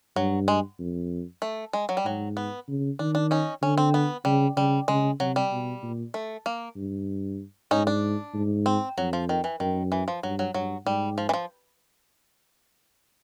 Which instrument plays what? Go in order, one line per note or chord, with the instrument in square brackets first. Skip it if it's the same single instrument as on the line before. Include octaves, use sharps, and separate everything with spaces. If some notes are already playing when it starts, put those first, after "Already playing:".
[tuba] G2 [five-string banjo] F#3
[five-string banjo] G#3
[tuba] F2
[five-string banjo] A3
G#3
F#3
G3
[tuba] G#2 [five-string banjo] F#3
[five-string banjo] B3
[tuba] C#3
[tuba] D#3 [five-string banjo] D4
[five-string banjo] D4
C#4 D#4
[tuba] D3 [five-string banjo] C#4
[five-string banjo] C4
B3
[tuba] C#3 [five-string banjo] G3
[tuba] C#3 [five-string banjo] G3
[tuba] C#3 [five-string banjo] G#3
[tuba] C3 [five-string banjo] F#3
[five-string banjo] G3
[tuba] B2
A#2
[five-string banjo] A3
A#3
[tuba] G2
[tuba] G#2 [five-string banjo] C#4 D#4
[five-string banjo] D4
[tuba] G#2
[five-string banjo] C4
[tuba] F2 [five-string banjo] F#3
[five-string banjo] F3
D#3
E3
[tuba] F#2 [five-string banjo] D#3
[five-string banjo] E3
F3
[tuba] G2 [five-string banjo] F#3
[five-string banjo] F#3
[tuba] G2 [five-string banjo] F#3
[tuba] G#2 [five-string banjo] G3
[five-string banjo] F3
E3
F3